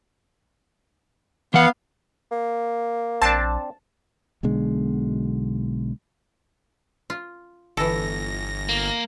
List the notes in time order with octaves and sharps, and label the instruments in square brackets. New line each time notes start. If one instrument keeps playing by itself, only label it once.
[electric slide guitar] E3 F#5 [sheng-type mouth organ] B3 F5
[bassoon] A#3
[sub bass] A#1 [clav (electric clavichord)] C4 D4 [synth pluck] A5
[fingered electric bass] B1 B2 D3 G#3
[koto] F4
[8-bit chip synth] G1 A#6 [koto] E3 A4
[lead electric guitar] A#3